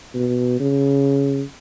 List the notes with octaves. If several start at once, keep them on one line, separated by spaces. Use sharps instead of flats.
B2
C#3